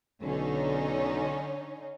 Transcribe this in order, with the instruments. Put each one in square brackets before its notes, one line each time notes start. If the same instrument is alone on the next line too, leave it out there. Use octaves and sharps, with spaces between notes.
[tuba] B1 [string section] D3 C#4 D#4